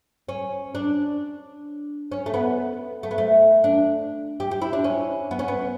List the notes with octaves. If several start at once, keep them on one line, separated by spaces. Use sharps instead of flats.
C#4
D4
C#4
A3
B3
A3
B3
A3
D4
G4
G4
E4
D4
C#4
B3
C#4
B3